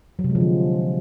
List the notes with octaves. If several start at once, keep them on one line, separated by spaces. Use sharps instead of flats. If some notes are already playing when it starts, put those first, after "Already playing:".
F#3
C3
G#3
F3
D3